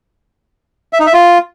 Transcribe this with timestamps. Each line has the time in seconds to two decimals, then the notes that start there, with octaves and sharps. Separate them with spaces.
0.93 E5
1.00 D#4
1.07 E5
1.13 F4